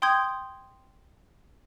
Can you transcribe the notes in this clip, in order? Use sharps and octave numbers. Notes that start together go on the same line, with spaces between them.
G5 C6 D#6 G6 G#6